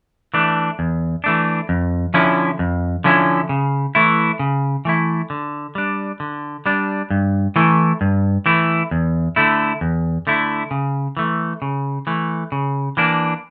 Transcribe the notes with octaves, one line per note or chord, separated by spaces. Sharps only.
E3 A3 D4
E2
E3 A3 D4
F2
D3 F3 C#4 E4
F2
D3 F3 C#4 E4
C#3
E3 A3 E4
C#3
E3 A3 E4
D3
G3 D4
D3
G3 D4
G2
E3 A3 E4
G2
E3 A3 E4
E2
D3 A3 E4
E2
D3 A3 E4
C#3
E3 A3
C#3
E3 A3
C#3
E3 A#3 D4